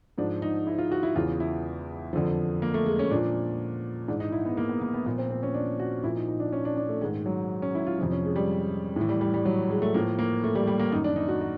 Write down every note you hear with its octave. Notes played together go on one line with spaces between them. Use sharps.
G#2 F3 D4
D#4
E4
F4
F#4
E4
E2 C#3 E3 F4
E4
F2 D3 F3
A#3
A3
G#3
C#4
A#2 F3 D4
G#2 E3 D4
D#4
E4
B3
A#3
B3
A#3
B3
A#2 F3 B3
C4
C4
C#4
D4
F#4
A#2 F3 E4
D#4
D#4
D4
C#4
D4
D4
A3
G#2 D#3 G#3
F#3
C#4
E4
F4
F2 C3 F3
C#4
G#3
G3
A2 E3
G3
G3
G3
F#3
G#3
A3
A2 F3 A#3
A#3
A3
G3
G3
A#3
F#2 D#3 D#4
D4
D#4
F#4
F#4